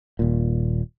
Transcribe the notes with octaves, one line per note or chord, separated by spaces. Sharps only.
D#1 A#2